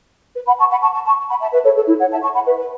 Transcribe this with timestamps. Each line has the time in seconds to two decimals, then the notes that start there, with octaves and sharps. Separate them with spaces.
0.35 B4
0.47 F#5 B5
0.59 A5 C#6
0.71 F#5 B5
0.82 A5 C#6
0.94 A5 C#6
1.05 A5 C#6
1.29 F#5 B5
1.41 E5 A5
1.52 B4 E5
1.64 A4 C#5
1.76 A4
1.87 E4
1.99 C#5 F#5
2.11 E5 A5
2.23 A5 C#6
2.34 F#5 B5
2.46 B4 E5
2.58 B4